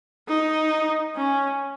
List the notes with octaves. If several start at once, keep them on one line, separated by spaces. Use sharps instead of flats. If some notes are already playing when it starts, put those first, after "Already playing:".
D#4
C#4